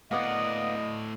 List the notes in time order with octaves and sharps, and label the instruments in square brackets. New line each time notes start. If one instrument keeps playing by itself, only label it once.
[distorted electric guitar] A2 D5 [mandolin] A#3 B3 F#5 [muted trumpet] D#5